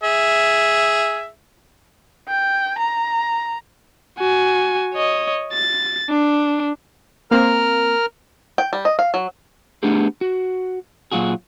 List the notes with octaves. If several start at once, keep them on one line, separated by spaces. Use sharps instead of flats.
G#4 E5
G5
A#5
F#4 G#5
C#5 D#5
A6
D4
A#3 C4 A#4 F6
G5
G3
D#5
F5
F#3
A3 B3 D4 G4 G#4
F#4
A#2 F#3 F4 F#4 G#4